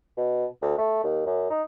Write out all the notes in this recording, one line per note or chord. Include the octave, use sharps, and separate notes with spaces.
B2
D2
A3
D#2
F#2
D#4